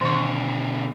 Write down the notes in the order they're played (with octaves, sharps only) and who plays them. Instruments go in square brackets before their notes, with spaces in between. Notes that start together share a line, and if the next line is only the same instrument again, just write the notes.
[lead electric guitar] B2 D3 [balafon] D#3 C#6